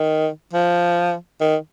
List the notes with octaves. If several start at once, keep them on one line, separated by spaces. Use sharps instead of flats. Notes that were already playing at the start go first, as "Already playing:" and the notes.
Already playing: D#3
F3
D#3